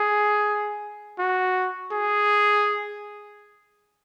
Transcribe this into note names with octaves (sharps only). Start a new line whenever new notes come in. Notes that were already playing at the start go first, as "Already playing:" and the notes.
Already playing: G#4
F#4
G#4